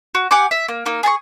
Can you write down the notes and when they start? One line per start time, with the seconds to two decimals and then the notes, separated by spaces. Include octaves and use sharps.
0.15 F#4
0.31 G4 F#5 G#5 D6
0.51 E5
0.68 A#3
0.86 A#3 D#4
1.03 G#4 G#5 A5 C#6